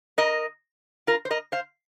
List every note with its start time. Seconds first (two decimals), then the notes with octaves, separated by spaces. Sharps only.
0.18 A#4 D#5
1.07 F4 A#4
1.25 C5
1.30 A#4 D#5
1.52 C5 F5